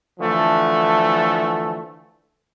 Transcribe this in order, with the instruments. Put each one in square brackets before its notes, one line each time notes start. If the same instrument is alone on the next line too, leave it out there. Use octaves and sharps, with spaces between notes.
[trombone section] D3 E3 F3 A3